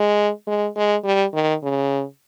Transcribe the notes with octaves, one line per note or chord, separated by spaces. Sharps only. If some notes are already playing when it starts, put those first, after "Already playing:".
Already playing: G#3
G#3
G#3
G3
D#3
C#3